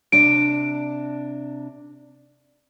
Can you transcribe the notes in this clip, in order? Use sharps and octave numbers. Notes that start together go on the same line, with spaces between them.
C3 D4 D7